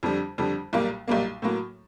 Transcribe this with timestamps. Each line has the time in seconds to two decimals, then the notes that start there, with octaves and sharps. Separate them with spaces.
0.03 F2 D3 G3
0.38 F2 D3 G3
0.73 B1 A#2 G3 A#3
1.08 B1 A#2 G3 A#3
1.42 A2 F#3 A#3